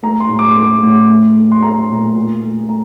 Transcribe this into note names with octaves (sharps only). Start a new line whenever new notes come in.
A3 A#5
C6
A2
D6
A3
A2
A3
A3
C6
A3 A#5
A#2
A#2
A3
A3 A#5